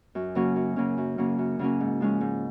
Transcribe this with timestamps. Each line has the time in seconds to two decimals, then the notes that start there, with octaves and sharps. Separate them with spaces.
0.15 F#2
0.35 C#3 F#3 A#3 C#4
0.56 F#2
0.76 C#3 F#3 A#3 C#4
0.98 F#2
1.18 C#3 F#3 A#3 C#4
1.39 F#2
1.59 C#3 F#3 A#3 C#4
1.80 G#2
2.00 F3 G#3 C#4
2.21 G#2